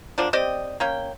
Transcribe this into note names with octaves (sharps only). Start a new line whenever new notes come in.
D3 F3 A#3 D4
C4 G4 D5 D#5
A#3 C#4 G5